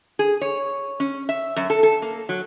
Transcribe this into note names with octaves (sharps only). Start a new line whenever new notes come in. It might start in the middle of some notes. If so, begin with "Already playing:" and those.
G#4
C#5
C#4
E5
F#2
A4
A4
A#3
F#3